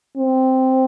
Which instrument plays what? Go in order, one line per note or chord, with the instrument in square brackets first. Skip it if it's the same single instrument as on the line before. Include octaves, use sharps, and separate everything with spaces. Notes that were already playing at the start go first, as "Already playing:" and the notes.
[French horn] C4